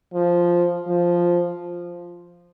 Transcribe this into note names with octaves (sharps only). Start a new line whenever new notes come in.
F3
F3